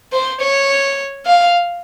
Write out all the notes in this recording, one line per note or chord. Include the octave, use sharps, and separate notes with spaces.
C5
C#5
F5